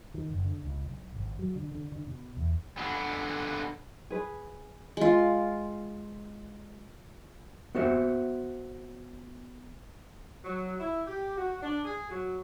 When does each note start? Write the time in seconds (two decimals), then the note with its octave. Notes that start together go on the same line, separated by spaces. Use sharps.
0.14 D#3
0.30 F#1
0.45 D3
0.63 C#2
0.85 B1
1.16 G#1
1.39 F#3
1.56 D3
1.72 D3
1.92 D3
2.07 B2
2.37 E2
2.78 D3 B3
4.10 G#4 B4
4.97 G#3 F4
7.75 B3 F#4 C5 E5
10.44 F#3
10.79 E4
11.07 G4
11.37 F#4
11.62 D4
11.85 G#4
12.09 F#3